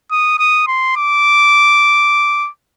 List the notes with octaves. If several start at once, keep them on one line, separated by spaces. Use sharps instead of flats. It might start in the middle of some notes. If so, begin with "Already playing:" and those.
D#6
D#6
C6
D6